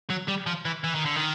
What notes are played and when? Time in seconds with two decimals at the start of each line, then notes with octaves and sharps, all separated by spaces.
0.10 F#3
0.28 G3
0.47 F3
0.65 E3
0.84 E3
0.95 D#3
1.06 D3
1.16 D#3